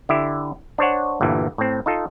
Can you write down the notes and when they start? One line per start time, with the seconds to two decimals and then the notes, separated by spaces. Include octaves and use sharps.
0.09 D3 E4 G4 E5
0.78 D4 C5 C#5 F#5
1.21 G1 G2 A#2 E3
1.58 A2 C4
1.86 D#4 F4 A4